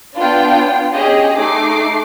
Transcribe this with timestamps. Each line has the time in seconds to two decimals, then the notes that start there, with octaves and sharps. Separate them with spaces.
0.18 B3 D4 F4 G5
0.93 C#4 G4 G#4 D#5
1.38 A3 D#4 D6 C7